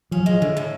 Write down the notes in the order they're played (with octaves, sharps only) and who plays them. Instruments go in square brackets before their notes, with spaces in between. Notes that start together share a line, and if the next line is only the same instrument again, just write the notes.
[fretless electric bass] F3 [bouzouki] C#4
[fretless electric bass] F#3
[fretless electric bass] F3 [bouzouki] G#3
[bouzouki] A2 [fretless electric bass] D3
[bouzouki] A2